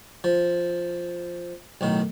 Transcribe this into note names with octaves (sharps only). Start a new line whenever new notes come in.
F3
B1 A2 D#3